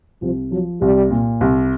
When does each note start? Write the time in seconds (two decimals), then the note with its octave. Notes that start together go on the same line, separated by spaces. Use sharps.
0.22 C2 F3
0.52 F3 F#3
0.81 C2 G3
1.11 A#2
1.41 C2